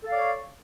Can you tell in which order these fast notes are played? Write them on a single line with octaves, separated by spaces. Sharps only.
A4 F5 D5 C#5